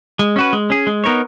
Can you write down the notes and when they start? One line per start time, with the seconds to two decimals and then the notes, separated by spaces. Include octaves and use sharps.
0.19 G#3
0.36 C#4 F#4 B4
0.53 G#3
0.70 C#4 G#4
0.87 G#3
1.04 B3 D#4 A#4 C#5